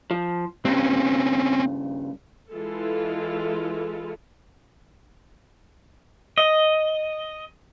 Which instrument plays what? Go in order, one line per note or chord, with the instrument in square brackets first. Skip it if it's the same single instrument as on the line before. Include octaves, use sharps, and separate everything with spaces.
[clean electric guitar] F3
[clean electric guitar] G2 C#3 [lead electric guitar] C4 C#4
[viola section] E3 G#3 E4 F4 A4
[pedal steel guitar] D#5